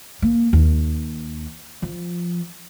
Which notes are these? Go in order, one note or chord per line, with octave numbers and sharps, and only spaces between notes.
A#3
D#2
F3